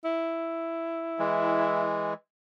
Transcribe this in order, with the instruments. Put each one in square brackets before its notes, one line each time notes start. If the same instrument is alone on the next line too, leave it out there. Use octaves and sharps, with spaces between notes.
[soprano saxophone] E4
[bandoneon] E3 G#3